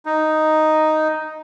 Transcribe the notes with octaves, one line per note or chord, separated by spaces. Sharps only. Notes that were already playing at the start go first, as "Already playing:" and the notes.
D#4